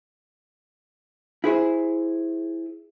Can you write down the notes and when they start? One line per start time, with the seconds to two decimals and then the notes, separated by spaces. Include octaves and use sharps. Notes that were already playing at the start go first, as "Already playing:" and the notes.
1.44 E4 G#4 C5